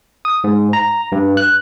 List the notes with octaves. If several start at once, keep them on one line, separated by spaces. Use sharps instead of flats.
D#6
G#2
A#5
G2
F#6